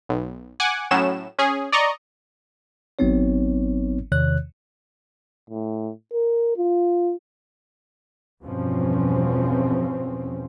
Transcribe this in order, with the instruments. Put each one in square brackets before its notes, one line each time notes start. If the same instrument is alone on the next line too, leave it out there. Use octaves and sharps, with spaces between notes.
[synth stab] B1
F#5 G#5 D6
A2 F#3 C#4 E7
C#4 G#4
D5 D#5 A#5 C#6
[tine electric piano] G#1 F#3 B3 C4 D#4 C#5
E2 C3 D#3 C#5 F#6
[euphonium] A2
A#4
F4
[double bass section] E2 G2 B2 F3 C4 C#4